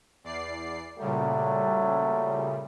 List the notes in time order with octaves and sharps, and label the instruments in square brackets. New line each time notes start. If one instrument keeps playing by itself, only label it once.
[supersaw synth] E2 D5 C7
[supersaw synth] A#2 C#3 G3 [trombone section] F#3 A3